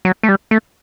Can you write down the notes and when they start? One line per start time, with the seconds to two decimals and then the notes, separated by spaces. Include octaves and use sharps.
0.05 F#3
0.23 A3
0.29 G3
0.51 A3